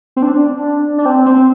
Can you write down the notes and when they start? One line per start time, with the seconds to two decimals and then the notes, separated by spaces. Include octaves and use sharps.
0.16 C4
0.23 D4
0.98 D4
1.05 C4
1.26 C4